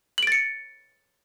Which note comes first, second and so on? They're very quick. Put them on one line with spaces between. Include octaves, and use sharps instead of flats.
F#7 D7 A6 C#7